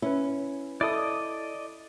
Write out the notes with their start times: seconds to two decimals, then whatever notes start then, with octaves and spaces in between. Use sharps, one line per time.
0.02 C#4 E4 B4
0.81 E4 A4 D5 D#5 D#6